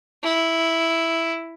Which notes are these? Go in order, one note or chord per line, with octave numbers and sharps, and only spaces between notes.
E4